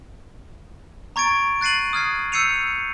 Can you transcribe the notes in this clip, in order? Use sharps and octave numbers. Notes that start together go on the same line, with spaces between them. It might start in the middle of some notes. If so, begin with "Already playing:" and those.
A#5 C#6 G#6 A6 D7
F#6 A6 C7 D#7 F#7
D#6 F6 G#6 C7
E6 G6 C7 C#7 D#7 F7